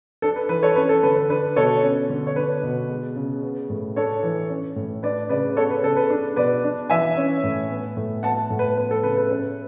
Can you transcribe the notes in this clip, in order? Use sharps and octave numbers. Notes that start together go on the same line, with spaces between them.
D4 A4
B4
E3 B4
A4 C#5
C#4 B4
A4
D3 B4
B4
D4 B4
B2 A4 C#5
C#4
D3
C#5
D4 B4
B2
G#3
C#3
B3
A2
D4 A4 C#5
E3
C#4
A2
D4 B4 D5
C#3 B4 D5
B3 A4 C#5
B4
C#3 A4
B4
D4
B2 B4 D5
D4
E3 E5 G#5
C#4
A2
B3
A2
B3 F#5 A5
A2
B4
B3 B4
A4
C#3 B4
B4
C#4 B4